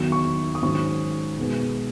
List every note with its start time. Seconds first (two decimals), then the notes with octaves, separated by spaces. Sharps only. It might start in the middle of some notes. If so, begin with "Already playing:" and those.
Already playing: E2 D#3 F#3
0.12 C#6
0.55 D#6
0.62 G#2 D#3 F#3 C#4 C#6
1.38 B2 G#3 B3